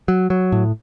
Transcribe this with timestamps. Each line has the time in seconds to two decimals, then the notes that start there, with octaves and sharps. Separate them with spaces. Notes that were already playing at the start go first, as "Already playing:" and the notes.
0.08 F#3
0.30 F#3
0.52 A2